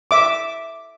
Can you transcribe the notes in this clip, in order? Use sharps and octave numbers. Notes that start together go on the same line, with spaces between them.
E5 D6